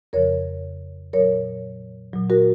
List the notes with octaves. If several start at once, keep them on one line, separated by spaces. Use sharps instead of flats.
F2 C#3 F3 A#4 C#5
A#2 F#3 A#4 C#5
A#2 F#3
F#4 A#4